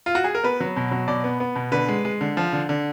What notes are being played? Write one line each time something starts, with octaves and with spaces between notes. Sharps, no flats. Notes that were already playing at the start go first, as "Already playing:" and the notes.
F4
F#4
G#4
A#4
B3 B4
F#3
B2
F#3
B2 D5
B3
B3
B2
D3 B4
G#3
G#3
D3
F3
D3
D3